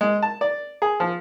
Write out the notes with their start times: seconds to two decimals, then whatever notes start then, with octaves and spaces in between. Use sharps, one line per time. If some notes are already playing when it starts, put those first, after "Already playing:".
0.01 G#3
0.22 A5
0.41 D5
0.82 G#4
1.00 F3